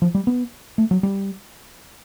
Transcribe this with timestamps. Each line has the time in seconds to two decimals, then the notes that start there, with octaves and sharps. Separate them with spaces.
0.02 F3
0.15 G3
0.27 B3
0.78 A3
0.91 F#3
1.03 G3